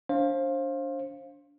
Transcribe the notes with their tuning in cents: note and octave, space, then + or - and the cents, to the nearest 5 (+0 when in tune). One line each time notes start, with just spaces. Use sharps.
D4 -25 C5 +30 F5 +0